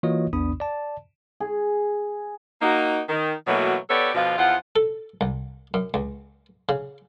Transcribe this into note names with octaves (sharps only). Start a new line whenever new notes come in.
E3 A#3 F4 F#4 C#5 D#5
A#1 E2 B3 D4 B5 D#6
D5 A5
G#4
A#3 D#4 F#4
D#3
B2 E3 F#3 A3 A#3 F#4
B3 G4 A4 C#5 D5
B2 D3 F3 F4
E2 F3 F4 F#5
A4
C2
F#2
C#2
C#3